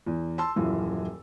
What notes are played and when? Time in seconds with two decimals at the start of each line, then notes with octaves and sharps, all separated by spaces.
0.06 E2
0.38 A5 C6 E6
0.56 D#1 F#2 E3 F4